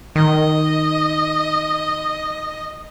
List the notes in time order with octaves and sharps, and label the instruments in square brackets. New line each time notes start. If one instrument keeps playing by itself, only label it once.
[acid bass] D#3 [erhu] D#5